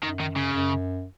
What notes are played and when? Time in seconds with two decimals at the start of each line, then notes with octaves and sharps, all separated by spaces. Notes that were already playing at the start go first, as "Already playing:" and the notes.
0.03 F#2 D#3
0.20 D#3
0.37 C#3
0.53 F#2